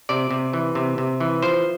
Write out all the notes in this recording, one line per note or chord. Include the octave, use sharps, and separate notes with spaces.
C3 D5
C3
E3
C3
C3
E3
F3 C5